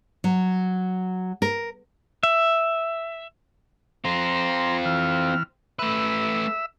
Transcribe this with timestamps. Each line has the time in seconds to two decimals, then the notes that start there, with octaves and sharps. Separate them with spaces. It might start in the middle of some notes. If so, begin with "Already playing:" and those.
0.24 F#3
1.42 A#4
2.23 E5
4.05 C4 F4 A#5 C6
4.85 E3 F6
5.79 A3 B4 E5